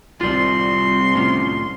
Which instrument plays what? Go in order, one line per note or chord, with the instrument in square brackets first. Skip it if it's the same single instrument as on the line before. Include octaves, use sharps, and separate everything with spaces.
[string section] C2 [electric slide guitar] F4 G4 D5 [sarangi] C6
[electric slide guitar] A2 C#4 F4